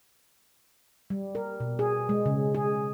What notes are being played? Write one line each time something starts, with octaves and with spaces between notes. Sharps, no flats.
G3
A#4
B2
G#4
G#3
C#3
G#4